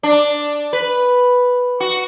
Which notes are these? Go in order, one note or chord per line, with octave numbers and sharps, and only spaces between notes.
D4
B4
F#4